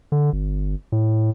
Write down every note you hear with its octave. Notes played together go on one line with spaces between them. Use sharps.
D3
G1
A2